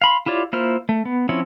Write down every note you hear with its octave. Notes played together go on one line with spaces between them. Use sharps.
F5 B5 C6
E4 F4 G4 C#5 D5
A#3 E4 F4 C5 F6
A3
B3
F3 C4 C#4 E4 C#5